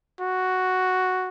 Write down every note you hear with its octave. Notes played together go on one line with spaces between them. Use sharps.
F#4